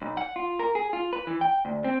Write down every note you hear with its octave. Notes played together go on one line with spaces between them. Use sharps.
B1
F#5
F4
A#4
G#4
F4
B4
E3
G5
D2
C4